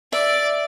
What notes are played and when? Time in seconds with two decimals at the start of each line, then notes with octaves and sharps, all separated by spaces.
0.13 D5 E5